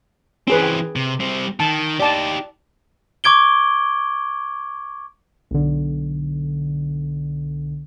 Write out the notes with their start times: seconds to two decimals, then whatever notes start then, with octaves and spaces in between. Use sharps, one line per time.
0.48 E3 C4 C#4 G#4 B4
0.63 G5
0.96 C3
1.20 G3 C4
1.60 D#3 A5
2.00 D#4 G4 D5 A5
3.24 C#6 D6 G#6 D7 G7
5.51 B1 D3